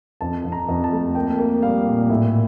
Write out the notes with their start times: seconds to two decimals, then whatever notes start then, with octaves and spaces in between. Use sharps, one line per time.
0.21 F2 A5
0.45 F2
0.52 A#5
0.68 F2
0.84 A5
0.93 A3
1.15 A#3 G5
1.39 A#3
1.62 G3 F5
1.86 A#2
2.10 A2 E5